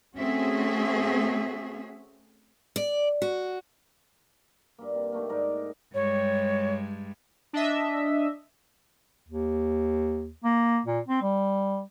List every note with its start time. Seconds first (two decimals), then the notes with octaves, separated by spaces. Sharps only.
0.17 A3 C4 C#4 F#4 G#4 E5
2.76 D5
3.22 F#4
4.79 G2 A#3
4.95 C3
5.12 D#3 A3 A#3
5.29 G#2 A#4 D5
5.94 G2 G3 G#3 C#5
7.53 D4 D#5 E5
9.28 D#2
10.44 A#3
10.86 A#2
11.08 C4
11.22 G3